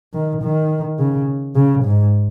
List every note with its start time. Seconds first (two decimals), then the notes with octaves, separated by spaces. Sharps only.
0.14 D#3
0.42 D#3
0.99 C#3
1.55 C#3
1.84 G#2